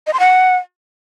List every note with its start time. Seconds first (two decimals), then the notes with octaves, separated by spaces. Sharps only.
0.07 D#5
0.13 C6
0.20 F#5